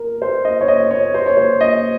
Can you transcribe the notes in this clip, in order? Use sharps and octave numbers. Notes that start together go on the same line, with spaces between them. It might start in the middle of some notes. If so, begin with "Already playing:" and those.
Already playing: A#4
C5
D#5
C#5
D#5
C#5
C5
C#5
C5
D#5